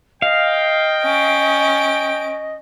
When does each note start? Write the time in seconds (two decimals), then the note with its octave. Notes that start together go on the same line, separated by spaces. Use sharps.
0.22 D#5 F5 G5
1.02 C#4 D7